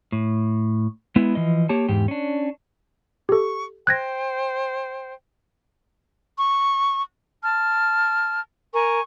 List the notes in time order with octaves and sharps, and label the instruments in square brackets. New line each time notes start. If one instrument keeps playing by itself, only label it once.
[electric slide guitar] A2
G#3 B3 E4
E3 F3 D#5
A#3 G4 C#5 A5
E2 G#2 G4
C#4 D4
[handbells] G4 A4 [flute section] C#6
[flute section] C5 G5 [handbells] F#6 G#6 A#6
[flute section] C#6
A5 F6
A#4 G#5 C#6